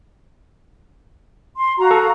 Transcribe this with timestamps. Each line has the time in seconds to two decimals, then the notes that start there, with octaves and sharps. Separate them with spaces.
1.58 C6
1.78 F#4 F5 A#5
1.91 A4